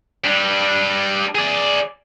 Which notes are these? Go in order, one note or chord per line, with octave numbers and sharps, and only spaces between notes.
G3 D4
G#4 D5